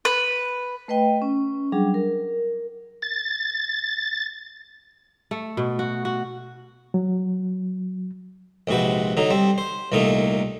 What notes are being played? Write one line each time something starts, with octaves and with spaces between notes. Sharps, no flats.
B4
A3 B4 D#5 G5
C#4
F#3 G3 D4 G#4
A#4
A6
A3
B2
F#4
F#4
F#3
A#1 G#2 C3 F#4 B4
D3 F#3 D#4
G3 C4
C5
C2 A#2 A3 A#3 D#4